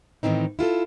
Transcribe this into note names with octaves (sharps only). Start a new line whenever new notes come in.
A2 D#3 E3 C4 D#4
E4 F4 G#4 A4